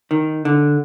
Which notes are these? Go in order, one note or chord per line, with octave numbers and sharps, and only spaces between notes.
D#3
D3